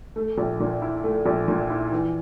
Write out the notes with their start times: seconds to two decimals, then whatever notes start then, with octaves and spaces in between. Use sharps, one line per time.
0.16 A3
0.38 A#1
0.60 A#2
0.82 E4
1.04 A3
1.26 A#1
1.48 A#2
1.70 E4
1.92 E3